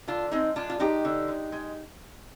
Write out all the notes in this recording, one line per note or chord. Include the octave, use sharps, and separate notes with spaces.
D3 D4 F4
G#3 C4 D#4
G#3 D4 F4
F4
G#3 D#4 G4
D3
G#3
G#3